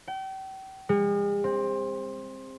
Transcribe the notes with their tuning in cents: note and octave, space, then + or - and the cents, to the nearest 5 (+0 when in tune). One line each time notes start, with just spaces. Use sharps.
G5 -35
G#3 -45
C4 +15